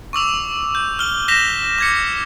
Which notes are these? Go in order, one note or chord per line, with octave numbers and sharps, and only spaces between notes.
C#6 D6 E6 F7
G6
F6 G7
G6 A#6 B6 E7 F7 G7
D6 G#6 C#7